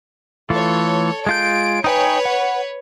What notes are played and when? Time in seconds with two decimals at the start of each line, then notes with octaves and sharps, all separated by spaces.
0.50 E3 A3 F4 A4 C#5
1.27 G#3 F4 G6 D7
1.84 D#4 B4 C#5 G5 G#5
2.25 F#5